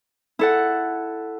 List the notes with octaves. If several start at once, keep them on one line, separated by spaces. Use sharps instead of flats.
E4 A4 F#5